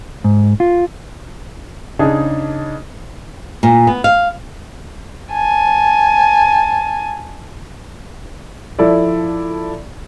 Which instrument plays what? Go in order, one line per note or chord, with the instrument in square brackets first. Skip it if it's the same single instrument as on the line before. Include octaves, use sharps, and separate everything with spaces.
[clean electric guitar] G#2
F4
[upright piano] C#3 D4 D#4 G#4
[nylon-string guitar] A#2
B3
F5
[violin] G#5 A5
[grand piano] F3 E4 A4 D5